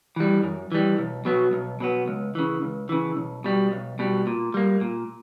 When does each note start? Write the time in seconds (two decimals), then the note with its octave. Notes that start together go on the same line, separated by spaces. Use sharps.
0.16 E3 G3
0.43 F#2
0.72 E3 G3
0.98 B1
1.25 B2 F#3 B3
1.53 B1
1.80 B2 F#3 B3
2.08 C#2
2.35 C#3 E3
2.63 C#2
2.89 C#3 E3
3.17 B1
3.44 B2 G3
3.72 B1
3.99 B2 G3
4.27 A#2
4.54 G3 A#3
4.81 A#2